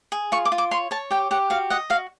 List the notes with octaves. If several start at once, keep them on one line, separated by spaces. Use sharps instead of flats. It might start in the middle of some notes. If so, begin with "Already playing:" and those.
G#4
F4 C#6
D6
F4
D6
C#5 C6
C#5 A5
G4 G5
G4 F#5
F#4 F5
D#5 F#5
F#4 F5